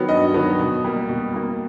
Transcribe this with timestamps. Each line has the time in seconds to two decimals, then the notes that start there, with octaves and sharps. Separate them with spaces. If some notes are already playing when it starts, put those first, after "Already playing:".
Already playing: D#3 F#3 B3
0.09 G2 D#5
0.34 D#3 F#3 B3
0.59 B2
0.84 G3 A#3
1.09 B2
1.34 G3 A#3